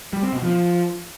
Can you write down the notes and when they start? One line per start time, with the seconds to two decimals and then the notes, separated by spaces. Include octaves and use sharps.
0.13 G3
0.23 C4
0.32 B2
0.42 F3